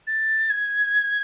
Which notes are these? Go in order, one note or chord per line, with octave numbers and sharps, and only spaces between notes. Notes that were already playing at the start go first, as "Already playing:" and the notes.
A6
G#6